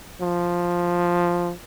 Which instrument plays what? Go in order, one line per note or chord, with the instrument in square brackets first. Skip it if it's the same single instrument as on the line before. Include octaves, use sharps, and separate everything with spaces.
[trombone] F3